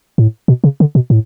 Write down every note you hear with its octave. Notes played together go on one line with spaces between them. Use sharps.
A2
B2
C#3
D3
B2
A2